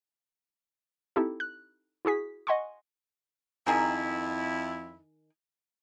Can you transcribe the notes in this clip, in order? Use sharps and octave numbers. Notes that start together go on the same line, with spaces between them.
C4 D#4 E4 G4 A4
F#6
E4 F#4 G#4 B6
D#5 F#5 G#5 C6 C#6
F2 D#3 E4 G#4 A#4